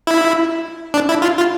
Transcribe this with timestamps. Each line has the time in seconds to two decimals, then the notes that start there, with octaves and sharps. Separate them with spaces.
0.07 E4
0.94 D4
1.09 E4
1.22 F4
1.37 F4